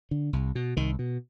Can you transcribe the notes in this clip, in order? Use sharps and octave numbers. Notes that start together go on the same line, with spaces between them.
D3
C2
B2
C2 D#3
B2